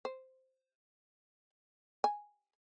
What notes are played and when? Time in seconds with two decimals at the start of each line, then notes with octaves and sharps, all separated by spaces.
0.05 C5
2.04 G#5